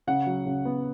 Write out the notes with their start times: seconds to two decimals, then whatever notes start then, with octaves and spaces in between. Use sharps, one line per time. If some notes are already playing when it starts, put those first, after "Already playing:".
0.07 C#3 F#5
0.26 F#3
0.46 C#3
0.65 B3